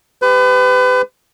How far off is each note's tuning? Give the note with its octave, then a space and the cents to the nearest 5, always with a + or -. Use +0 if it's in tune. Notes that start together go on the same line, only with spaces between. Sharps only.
G4 +20 B4 +35